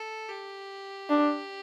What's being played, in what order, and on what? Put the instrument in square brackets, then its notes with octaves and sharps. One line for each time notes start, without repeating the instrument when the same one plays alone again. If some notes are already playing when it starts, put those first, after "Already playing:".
Already playing: [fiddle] A4
G4
[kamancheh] D4